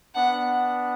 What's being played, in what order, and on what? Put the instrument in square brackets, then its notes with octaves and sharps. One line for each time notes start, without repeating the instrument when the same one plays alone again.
[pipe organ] B3 D4 [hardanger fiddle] F#5